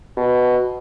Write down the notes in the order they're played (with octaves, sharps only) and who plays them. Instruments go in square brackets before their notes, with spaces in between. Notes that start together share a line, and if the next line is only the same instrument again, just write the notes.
[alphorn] B2